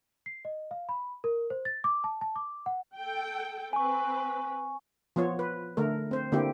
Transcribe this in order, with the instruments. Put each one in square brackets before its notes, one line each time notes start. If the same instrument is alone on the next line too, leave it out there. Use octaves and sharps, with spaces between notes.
[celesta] C7
D#5
F5
B5
A#4
C5
A6
D6
A5
A5
D6
F#5
[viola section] A4 G5
[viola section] C4 B4 [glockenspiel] G#5 C#6
[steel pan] F3 B3 F4 C#5
B4
D3 A3 A#4
C4 C5
D3 A#3 C4 E4 G4